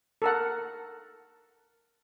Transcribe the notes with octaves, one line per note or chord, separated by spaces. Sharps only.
A4 A#4 F#5